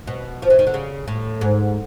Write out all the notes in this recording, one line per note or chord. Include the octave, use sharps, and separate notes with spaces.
B2
F3
E3
D#3
D3
C#3
A2
G#2